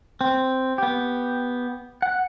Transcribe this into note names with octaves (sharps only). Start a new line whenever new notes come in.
C4
B3 G4
F#5